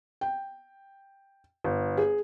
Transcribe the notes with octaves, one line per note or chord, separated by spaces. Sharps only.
G5
G1
G#4